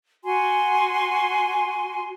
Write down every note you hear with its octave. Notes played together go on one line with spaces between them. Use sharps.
F#4 G#5 C6